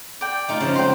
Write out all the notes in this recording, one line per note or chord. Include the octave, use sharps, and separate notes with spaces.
D5 G5
A3 D#4 F4
C#3 F3
G#3 C4 C5 G5 C6